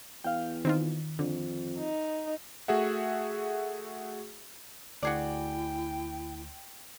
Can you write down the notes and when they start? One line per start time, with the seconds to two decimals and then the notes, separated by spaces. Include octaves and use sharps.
0.24 E2 F5 G5
0.65 D#3 C4 D#4 F4
1.19 F2 D3
1.79 D#4
2.68 A3 F#4 G#4 E5 F#5
5.03 D2 E4 F#4 G#4 D5 G5